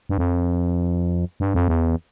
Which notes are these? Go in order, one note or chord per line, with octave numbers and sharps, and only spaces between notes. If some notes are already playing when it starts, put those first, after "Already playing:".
G2
F2
G2
F2
E2